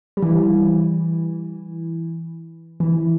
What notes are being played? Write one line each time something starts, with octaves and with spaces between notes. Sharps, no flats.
G3
E3
E3